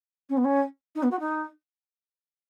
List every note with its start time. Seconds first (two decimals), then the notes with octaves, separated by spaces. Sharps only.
0.29 C#4
0.37 B3
0.44 C#4
0.95 D#4
1.03 B3
1.11 F#4
1.20 D#4